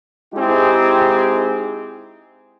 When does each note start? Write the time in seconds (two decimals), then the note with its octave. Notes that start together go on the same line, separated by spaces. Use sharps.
0.35 G#3 C4 D#4 E4 G4 G#4